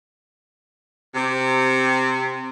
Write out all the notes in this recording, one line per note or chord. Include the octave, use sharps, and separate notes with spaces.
C3